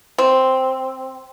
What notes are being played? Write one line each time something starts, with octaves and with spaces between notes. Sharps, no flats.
C4